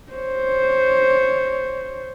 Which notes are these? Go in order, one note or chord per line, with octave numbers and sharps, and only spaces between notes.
C5 C#5